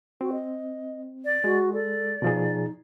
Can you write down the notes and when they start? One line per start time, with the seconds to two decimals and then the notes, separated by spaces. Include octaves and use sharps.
0.21 C4 F#4
0.32 D#5
1.25 D5
1.44 G#3 F#4
1.73 A4 D5
2.22 B2 F3 D#4 G#4